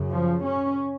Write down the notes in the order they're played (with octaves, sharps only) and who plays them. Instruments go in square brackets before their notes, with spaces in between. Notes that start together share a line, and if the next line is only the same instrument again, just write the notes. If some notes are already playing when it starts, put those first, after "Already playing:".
Already playing: [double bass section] F#2 C#3
F3
C#4